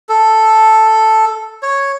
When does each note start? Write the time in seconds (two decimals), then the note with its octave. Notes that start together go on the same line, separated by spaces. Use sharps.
0.09 A4
1.63 C#5